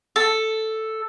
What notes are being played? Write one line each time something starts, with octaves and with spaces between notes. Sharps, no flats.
A4